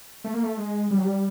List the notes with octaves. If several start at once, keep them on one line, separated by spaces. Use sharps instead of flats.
A3
A#3
A3
G#3
G3
F#3
G3